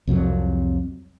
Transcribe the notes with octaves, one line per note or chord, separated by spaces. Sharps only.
C2 F2 C3 F#3